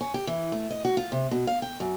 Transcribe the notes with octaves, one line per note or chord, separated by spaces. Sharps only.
C#4
G4
E3
A3
D#5
F#4
F4
C3
B2
F5
G5
F#2